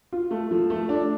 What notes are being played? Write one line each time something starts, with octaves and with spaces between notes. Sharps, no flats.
F4
A3
F3
A3
D4